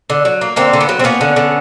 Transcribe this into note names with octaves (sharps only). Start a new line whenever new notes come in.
D3
F#3
A#3
D3 A#3 C4
D3
B3
F#3
C4
A#3 B3 C#4
D3
D3